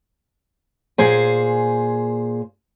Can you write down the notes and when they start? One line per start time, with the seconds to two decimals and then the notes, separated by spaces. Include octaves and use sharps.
0.98 A#2 G#4 C5 G#5